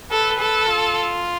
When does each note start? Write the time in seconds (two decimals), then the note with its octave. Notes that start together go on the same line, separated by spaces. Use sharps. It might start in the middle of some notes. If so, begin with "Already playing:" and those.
0.11 A4 B4
0.40 A4
0.68 F4